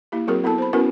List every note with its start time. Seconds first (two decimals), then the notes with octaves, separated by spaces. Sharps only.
0.12 A#3 E4 G4
0.27 F#3 C4 F#4 G#4 A#4
0.44 B3 E4 A4 A5
0.58 C5 B5
0.73 B3 C#4 E4 F#4 A#4 B4